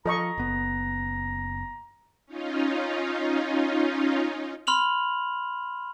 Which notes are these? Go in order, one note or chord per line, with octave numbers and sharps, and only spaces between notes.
F3 A4 D#5 A#5 C#6
F#1 B3
C#4 D#4 F4
B5 C6 F6 F7 F#7